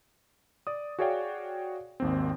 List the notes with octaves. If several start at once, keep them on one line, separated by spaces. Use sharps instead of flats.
D5 D#6
F#4 G#4 C#5 D5 F5 G5
G#1 D#2 C4